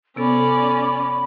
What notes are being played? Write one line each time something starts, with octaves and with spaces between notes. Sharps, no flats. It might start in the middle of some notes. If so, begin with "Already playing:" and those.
C3 B3 C#4 A4 D5 B5